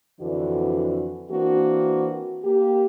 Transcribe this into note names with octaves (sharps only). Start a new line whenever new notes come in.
F2 D3 E3 D4 F#4
E3 A#3 C4 D4 F#4
A#3 G4